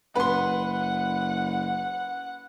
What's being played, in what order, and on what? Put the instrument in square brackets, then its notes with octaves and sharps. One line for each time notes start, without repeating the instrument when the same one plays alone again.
[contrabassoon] F#1 [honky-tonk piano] B4 C6 [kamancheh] F#5